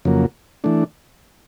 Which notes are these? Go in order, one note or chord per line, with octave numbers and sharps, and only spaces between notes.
F2 C#3 F#3 A#3
E3 A3 D4